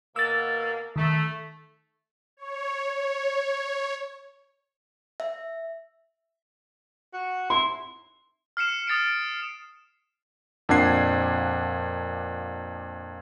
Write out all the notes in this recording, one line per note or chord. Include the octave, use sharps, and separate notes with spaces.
B2 A#3 E6 A6
D#3 A3
C#5
C#5
E5
F#4
E4 C6
F6 C7 C#7 E7
D#6 A6 C7 D7
F2 A#2 D4 F#5 G#6 C7